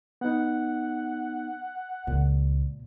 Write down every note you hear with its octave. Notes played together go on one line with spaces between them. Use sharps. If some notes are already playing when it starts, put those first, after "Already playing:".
B3 D#4 F#5
C#2 A#2